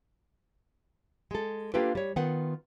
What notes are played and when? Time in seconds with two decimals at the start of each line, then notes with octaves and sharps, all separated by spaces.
1.31 G#3 A4
1.74 A#3 D4 F4 G4 A4 B4
1.95 G3 C#5
2.16 D#3 B3 F4 F#5